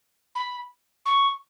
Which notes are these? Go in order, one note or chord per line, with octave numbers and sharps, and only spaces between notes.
B5
C#6